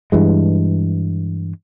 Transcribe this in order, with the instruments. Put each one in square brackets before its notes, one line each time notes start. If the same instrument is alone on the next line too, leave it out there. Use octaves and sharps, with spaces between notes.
[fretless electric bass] G2 E3 G#3